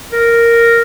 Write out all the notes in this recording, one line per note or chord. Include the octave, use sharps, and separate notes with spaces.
A#4